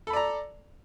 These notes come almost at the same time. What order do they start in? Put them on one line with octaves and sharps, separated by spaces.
A4 B5 D5 A#5